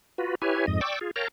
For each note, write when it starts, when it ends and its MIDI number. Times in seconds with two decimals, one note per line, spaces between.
0.18 0.35 65
0.18 0.35 66
0.18 0.35 71
0.42 0.66 64
0.42 0.66 67
0.42 0.66 71
0.42 0.66 73
0.42 0.66 80
0.67 0.81 41
0.67 0.81 44
0.67 0.81 75
0.81 0.99 74
0.81 0.99 79
0.81 0.99 85
0.81 0.99 86
0.81 0.99 88
1.01 1.11 65
1.01 1.11 68
1.16 1.28 70
1.16 1.28 73
1.16 1.28 77
1.16 1.28 79
1.16 1.28 81
1.16 1.28 82